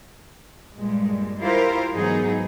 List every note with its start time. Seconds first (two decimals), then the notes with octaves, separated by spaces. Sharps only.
0.76 G2 A#2 G#3
1.39 E4 F4 G4 A#4 C5 F5
1.93 G#2 E3 F#3 B3 D#4 G#4